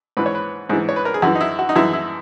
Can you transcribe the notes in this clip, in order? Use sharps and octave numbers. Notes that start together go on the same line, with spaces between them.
G#2 E3 B4
C#5
B4
G#2 E3 G#4
C#5
B4
A#4
G#4
F#2 E3 F#4
D#4
E4
F#4
D#4
F#2 E3 E4
E4